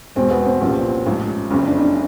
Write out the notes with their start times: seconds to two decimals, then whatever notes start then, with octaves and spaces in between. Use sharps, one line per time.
0.16 E2 B2 G#3 C4
0.31 B3
0.46 C4
0.61 C2 A#2 F3 C#4
1.06 A1 G#2 F3
1.51 F#1 F2 C#3 C#4
1.67 D4
1.77 D#4
1.81 D4